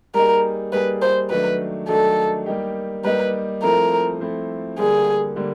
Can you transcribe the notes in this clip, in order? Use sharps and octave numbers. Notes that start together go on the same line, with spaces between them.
G3 A#3 D#4 G#4 A#4
G3 A#3 D#4 G#4 B4
C5
D#3 F#3 A3 D4 B4
D#3 F#3 A3 D4 A4
G3 A#3 D#4 G4
G3 A#3 D#4 G4 B4
F3 A3 C4 E4 A4 A#4
F3 A3 C4 E4 A4
D3 G3 A#3 G#4
D3 G3 A#3